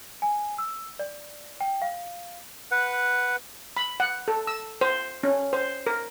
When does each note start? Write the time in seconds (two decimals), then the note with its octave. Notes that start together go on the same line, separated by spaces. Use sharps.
0.22 G#5
0.58 E6
0.99 D5
1.60 G5
1.82 F5
2.71 B4 F#5
3.77 B5
4.00 F#5
4.28 A4
4.47 E6
4.81 C5
5.23 C#4
5.53 C5
5.87 A#4